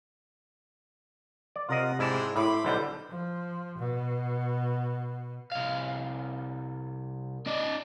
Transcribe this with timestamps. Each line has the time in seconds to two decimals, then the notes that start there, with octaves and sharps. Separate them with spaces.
1.56 D5
1.69 C3 F4 A#4 D#5 F#5
1.99 G#2 G#3 C4 D4 E4 A5
2.36 A2 E4 B5 C6 D6
2.65 B1 D3 G3 C5 G6
3.10 F3
3.78 B2
5.52 C2 F5
7.46 D#4 D5